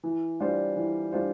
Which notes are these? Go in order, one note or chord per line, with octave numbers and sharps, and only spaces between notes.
E3
G3 D4 F4 C5
E3
G3 D4 F4 C5